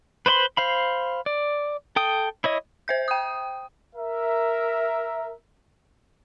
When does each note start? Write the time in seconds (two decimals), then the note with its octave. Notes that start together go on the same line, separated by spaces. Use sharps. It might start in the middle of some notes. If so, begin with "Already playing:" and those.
0.26 B4 C5 D5 B5 C6
0.57 C5 F5 B5
1.26 D5
1.96 A4 G5 D#6
2.44 E4 C#5 D#5
2.88 C5 E5 G6
3.08 G5 D#6
3.96 A#4 E5